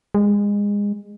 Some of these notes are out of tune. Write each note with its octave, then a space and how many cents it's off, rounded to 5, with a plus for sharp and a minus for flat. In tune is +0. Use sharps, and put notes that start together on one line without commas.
G#3 -25